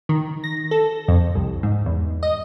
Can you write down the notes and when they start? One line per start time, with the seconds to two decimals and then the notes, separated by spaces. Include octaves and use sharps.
0.09 D#3
0.44 A#6
0.71 A4
1.08 F2
1.35 C2
1.63 G#2
1.86 E2
2.23 D#5